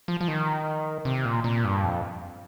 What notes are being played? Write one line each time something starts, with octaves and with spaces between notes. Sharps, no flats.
F3
F3
D#3
C3
A#2
A#2
G2
F2